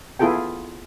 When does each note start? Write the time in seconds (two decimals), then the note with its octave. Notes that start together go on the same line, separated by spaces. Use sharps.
0.19 B3 E4 F4 G#4 A4 G5